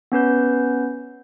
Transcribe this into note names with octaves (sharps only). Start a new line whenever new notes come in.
B3 C#4 B4 G6